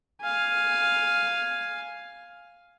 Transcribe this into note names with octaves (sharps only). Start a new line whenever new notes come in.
F5 G#5